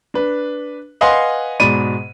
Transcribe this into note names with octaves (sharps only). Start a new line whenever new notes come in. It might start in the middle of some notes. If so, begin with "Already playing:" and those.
D4 B4
B4 D#5 F5 F#5 G#5 C6
G#2 B2 G#3 D5 B5 D#7